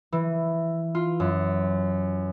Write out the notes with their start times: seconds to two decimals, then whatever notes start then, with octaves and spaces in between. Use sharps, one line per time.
0.12 E3
0.95 F4
1.20 F#2